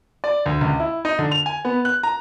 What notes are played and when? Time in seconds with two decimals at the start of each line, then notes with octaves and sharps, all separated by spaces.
0.24 D5
0.46 D2
0.61 C#2
0.80 E4
1.05 D#4
1.19 D3
1.31 F7
1.46 G#5
1.65 B3
1.85 F#6
2.03 A#5